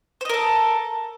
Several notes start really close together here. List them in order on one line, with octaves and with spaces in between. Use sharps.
C5 D#5 A#4 A4